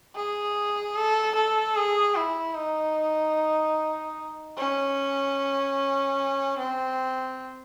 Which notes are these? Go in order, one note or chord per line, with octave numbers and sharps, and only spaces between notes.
G#4
A4
A4
G#4
E4
D#4
C#4
C4